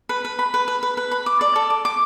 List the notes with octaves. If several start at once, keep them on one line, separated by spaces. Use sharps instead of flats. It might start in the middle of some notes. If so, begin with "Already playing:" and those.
B4
B4
B5
B4
B4
B4
B4
B5
D6
D5
A4
D6
D6